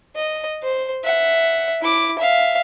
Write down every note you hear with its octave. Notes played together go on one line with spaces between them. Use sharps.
D#5
C5
E5 F#5
E4 D6
E5 F5